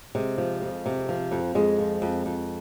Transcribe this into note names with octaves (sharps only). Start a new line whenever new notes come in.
C3 G#3
F3
F2
C3
F3
F2
F2 G#3
F3
F2
F2